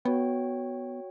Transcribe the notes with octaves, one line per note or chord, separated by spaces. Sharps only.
B3 F#4 C#5 G5